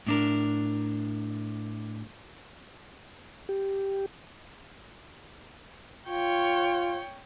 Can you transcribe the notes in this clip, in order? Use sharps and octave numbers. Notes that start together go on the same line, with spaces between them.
A2 D4 A#4
G4
F4 C#5 G5